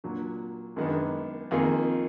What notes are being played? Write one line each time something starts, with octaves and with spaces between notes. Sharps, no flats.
A#2 F#3 D4
F#2 D#3 G#3 B3 D4
F2 D#3 A#3 F4 G#4